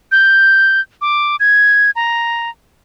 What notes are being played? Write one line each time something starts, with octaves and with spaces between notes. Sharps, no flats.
G6
D6
G#6
A#5